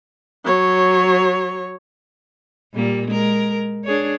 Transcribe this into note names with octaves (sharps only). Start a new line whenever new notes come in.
F#3 C#5
A#2 G3 A#3
G#3 A#4
D4 G#4 C#5